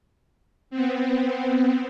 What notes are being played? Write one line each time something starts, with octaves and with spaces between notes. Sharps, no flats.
B3 C4